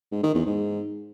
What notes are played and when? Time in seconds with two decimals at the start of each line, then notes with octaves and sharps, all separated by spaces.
0.12 G#2
0.23 D#3
0.34 E2
0.46 G#2